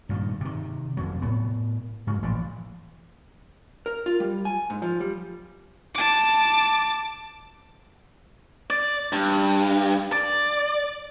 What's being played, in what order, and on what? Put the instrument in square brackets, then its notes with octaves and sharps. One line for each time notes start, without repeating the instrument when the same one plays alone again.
[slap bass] G2 A#2 D#3
C3 D#3
F1 F2 F#3
A2 B3
G#2 C#3 F#3
A1 A#2 F3
[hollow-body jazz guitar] A#4
F4
G3
G#5
G#2
F3
G3
[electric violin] A5 D6
[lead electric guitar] D5
G2
D5